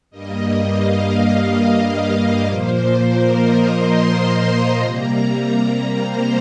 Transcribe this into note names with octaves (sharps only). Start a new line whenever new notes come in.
G2 G3 A#3 D#5
F5
D#5
A#2 F3 A#3 C5
A#4
D#5
C6
C3 G3 A#3 A#5
C5